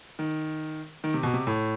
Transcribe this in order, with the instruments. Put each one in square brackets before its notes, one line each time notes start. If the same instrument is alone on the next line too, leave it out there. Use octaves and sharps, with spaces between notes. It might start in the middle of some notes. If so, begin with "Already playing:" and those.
[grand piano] D#3
D#3
C3
B2
C3
A2